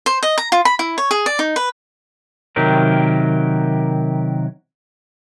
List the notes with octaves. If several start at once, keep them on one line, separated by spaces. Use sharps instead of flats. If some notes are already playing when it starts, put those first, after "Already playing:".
C5
D#5
A#5
F4
B5
E4
C#5
G#4
D5
D#4
B4
C3 D#3 F#3 G4 A#4